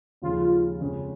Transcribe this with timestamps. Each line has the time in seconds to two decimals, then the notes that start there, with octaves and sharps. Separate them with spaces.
0.22 D#2 C#3 F3 G#3 F4
0.80 F2 C#3 G#3 C#4 G#4